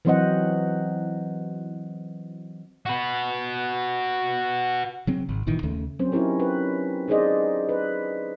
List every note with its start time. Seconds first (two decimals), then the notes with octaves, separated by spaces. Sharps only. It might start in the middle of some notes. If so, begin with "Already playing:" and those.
0.05 E3 F#3 C4 C5 D#5 F#5
2.86 F#4 B4
5.07 C#3 F#3 C4
5.29 G#1
5.47 G1 A#2 D#3 E3
5.63 D#2 C#3 A3
5.99 F#3 C4 C#4 C5
6.12 C#4 D#4 E4 G4 A#4 C#5
6.40 B4
7.08 D4 D#4 G#4 C5 D5 D#5
7.69 B4